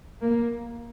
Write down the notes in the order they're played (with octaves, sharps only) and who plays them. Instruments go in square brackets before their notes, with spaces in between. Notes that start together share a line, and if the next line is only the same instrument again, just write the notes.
[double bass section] A#3